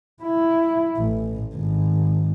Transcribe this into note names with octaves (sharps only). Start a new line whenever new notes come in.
E4
A1
G#1